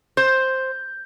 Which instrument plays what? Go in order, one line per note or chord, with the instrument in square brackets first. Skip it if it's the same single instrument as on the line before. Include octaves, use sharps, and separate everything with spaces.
[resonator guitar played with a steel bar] C5 [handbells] G6